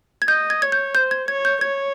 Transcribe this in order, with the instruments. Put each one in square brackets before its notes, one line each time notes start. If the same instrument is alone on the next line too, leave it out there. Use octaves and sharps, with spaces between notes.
[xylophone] G#6
[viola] D#5 [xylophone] G6
[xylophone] G#6
[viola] C#5 [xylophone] G#6
[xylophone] G6
[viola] C5 [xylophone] G6
[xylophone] G#6
[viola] C#5 [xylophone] G#6
[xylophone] G6
[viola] C#5 [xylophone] G#6